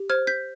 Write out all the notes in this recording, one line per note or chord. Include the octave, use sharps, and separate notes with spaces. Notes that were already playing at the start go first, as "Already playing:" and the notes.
Already playing: G4
C5 F6 G#6
G6 B6